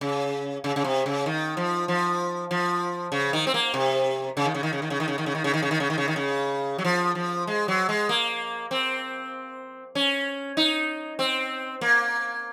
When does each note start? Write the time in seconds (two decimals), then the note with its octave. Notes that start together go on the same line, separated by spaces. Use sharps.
0.01 C#3
0.64 C#3
0.76 C#3
0.84 C3
1.06 C#3
1.26 D#3
1.57 F3
1.88 F3
2.51 F3
3.12 C#3
3.33 D#3
3.47 C4
3.54 A#3
3.74 C3
4.37 C#3
4.45 D#3
4.54 C#3
4.63 D#3
4.73 C#3
4.82 D#3
4.90 C#3
5.00 D#3
5.08 C#3
5.18 D#3
5.26 C#3
5.35 D#3
5.44 C#3
5.54 D#3
5.62 C#3
5.71 D#3
5.80 C#3
5.90 D#3
5.98 C#3
6.08 D#3
6.16 C#3
6.78 F#3
6.85 F3
7.15 F3
7.47 G#3
7.68 F#3
7.89 G#3
8.09 A#3
8.71 C4
9.95 C#4
10.57 D#4
11.19 C4
11.81 A#3